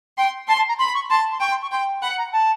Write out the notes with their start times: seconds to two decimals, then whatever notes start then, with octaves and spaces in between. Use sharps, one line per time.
0.17 G5 C6
0.48 A5 C6
0.58 A5
0.68 A#5
0.78 B5 C6
0.94 C#6
1.10 A5 C6
1.31 C6
1.40 G5 C#6
1.51 C6
1.62 C#6
1.71 G5 C6
2.02 F#5 B5
2.18 A#5
2.33 A5